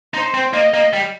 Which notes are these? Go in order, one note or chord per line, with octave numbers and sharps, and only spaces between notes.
D#4 C5
C4
A#3 D#5
A#3
G3